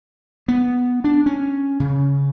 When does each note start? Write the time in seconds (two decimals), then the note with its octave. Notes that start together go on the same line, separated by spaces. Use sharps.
0.48 B3
1.04 D4
1.26 C#4
1.80 C#3